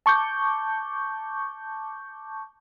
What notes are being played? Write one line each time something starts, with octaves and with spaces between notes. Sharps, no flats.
A5 C#6 D6 G6